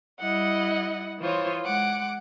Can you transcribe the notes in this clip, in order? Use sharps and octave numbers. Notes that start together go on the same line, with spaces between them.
G3 E4 D#5 F#5
E3 F4 C5 C#5 D#6
G#3 F#5 D6